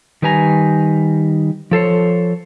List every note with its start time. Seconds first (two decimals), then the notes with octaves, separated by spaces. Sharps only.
0.22 D#3 G3 B4 G#5 A#5
1.71 F3 A4 C5 C#5